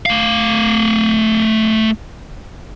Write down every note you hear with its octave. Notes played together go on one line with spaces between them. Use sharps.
A3 F5